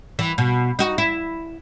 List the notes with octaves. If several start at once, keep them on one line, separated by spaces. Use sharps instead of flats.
E3
B2
D#4 F#4
E4